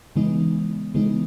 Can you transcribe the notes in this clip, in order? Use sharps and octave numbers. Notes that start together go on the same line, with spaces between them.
C#3 E3 G#3 B3 D#4
C#3 E3 G#3 B3 D#4